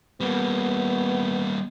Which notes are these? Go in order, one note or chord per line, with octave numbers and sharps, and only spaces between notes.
G3 A#3 B3